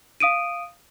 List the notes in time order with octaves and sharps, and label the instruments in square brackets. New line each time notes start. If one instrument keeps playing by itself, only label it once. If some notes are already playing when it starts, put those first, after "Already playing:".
[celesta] F5 D#6 D7 D#7